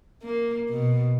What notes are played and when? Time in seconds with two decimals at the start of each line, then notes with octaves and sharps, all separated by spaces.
0.22 A#3
0.69 B2